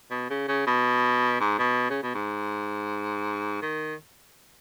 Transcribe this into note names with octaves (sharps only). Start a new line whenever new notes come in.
B2
C#3
C#3
B2
G#2
B2
C#3
B2
G#2
D#3